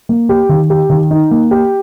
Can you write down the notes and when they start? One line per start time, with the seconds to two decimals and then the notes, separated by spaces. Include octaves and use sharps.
0.09 A#3
0.29 G4
0.49 D#3
0.70 G4
0.90 D#3
1.11 D#4
1.31 A#3
1.51 G4